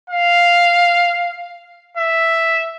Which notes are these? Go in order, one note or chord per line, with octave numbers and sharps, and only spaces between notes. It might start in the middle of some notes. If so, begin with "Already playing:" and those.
F5
E5